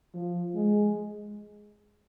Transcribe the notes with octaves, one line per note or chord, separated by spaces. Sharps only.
F3
G#3